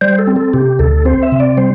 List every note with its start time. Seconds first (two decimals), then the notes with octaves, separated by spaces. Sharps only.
0.01 G3 C5
0.19 A4
0.27 C4
0.36 A4
0.53 C3 G4
0.79 D2 A4
1.05 C4 C5
1.23 E5
1.32 C3
1.40 D5
1.57 G3 C5